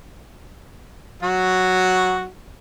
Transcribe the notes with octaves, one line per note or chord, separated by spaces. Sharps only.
F#3 F#4